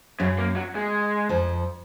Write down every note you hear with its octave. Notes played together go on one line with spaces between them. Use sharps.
F#2 C#3 F#3
A#3
F#3
G#3
F2 F3